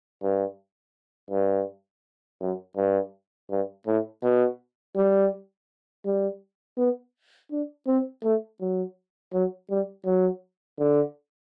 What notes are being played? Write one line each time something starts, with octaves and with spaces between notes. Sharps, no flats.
G2
G2
F#2
G2
G2
A2
B2
G3
G3
B3
D4
C4
A3
F#3
F#3
G3
F#3
D3